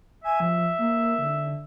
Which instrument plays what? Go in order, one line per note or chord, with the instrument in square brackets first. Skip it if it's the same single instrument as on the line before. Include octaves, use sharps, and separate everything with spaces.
[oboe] E5 [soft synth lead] G#5
[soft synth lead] F3
A#3
D3